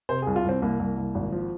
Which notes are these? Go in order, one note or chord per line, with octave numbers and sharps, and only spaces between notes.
C3 C5
G#4
C2
F4
C2 C4
C2 A#3
C2
C2
G#1
F3